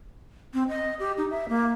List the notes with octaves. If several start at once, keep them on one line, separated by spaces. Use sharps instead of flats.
C4
D#5
G4
D#4
E5
A#3